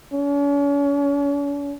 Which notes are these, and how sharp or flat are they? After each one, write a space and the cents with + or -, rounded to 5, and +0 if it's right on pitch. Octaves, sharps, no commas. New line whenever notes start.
C#4 +45